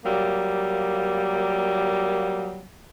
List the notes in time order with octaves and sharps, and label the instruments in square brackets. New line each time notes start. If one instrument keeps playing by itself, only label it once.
[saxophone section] F#3 G3 A#3